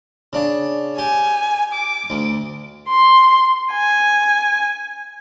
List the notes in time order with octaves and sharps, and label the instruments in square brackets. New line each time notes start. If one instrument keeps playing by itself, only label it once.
[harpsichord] C#3 D4
[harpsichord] G4 [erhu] G#5
[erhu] D6
[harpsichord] D2
[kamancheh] C6
G#5